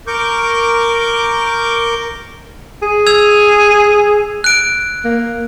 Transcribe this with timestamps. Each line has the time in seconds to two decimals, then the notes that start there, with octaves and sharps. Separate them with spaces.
0.07 A#4 C#6 D6 G6
2.82 G#4
3.07 E6 G#6 F7
4.44 F#6 D7
5.05 A#3